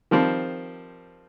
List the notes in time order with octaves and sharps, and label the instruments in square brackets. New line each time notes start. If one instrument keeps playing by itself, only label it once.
[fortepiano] D#3 F3 G3 C4